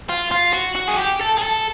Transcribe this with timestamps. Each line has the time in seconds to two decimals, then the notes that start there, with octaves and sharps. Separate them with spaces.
0.09 F4
0.31 F4
0.54 F#4
0.76 F#4
0.88 G#4
0.98 G4
1.21 A4
1.38 G#4
1.43 A4